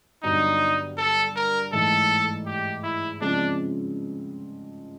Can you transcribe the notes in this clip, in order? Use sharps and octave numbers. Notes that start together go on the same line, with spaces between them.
G2 D3 F#3 B3 D4 D#4
A4
A#4
G#2 E3 A3 A4
G4
E4
C#3 F3 G#3 C4 D4 F4